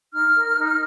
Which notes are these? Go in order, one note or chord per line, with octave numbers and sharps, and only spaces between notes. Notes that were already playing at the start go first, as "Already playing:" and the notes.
D#4 F6
A#4
D#4